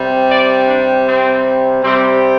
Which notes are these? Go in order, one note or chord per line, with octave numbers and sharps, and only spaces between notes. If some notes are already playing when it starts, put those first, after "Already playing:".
Already playing: C3 G3
D5
D4
C4
C3 G3 C4